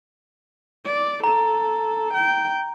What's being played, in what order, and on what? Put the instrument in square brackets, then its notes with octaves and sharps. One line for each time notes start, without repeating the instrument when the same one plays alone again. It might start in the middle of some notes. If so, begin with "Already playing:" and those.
[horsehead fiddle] D5
[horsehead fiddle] A4 [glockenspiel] A#5
[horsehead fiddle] G5